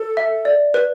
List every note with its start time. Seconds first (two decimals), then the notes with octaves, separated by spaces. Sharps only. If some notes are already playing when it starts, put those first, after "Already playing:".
Already playing: A4
0.17 E5
0.45 D5
0.74 B4